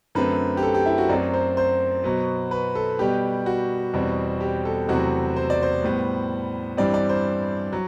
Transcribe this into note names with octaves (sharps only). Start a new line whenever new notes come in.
F#2 D3 A3 C4 B4
G4
A4
G4
E4
F#4
F#2 F#3 A3 C4 D5
C5
C5
B2 F#3 B3
B4
A4
B2 G3 B3 G4
F#4
E2 B2 G3 C4
G4
A4
E2 C3 F#3 A3 C4 F#4
C5
D5
C5
A2 G3 B3
G2 E3 G3 C4 D5
D5
C5
F#3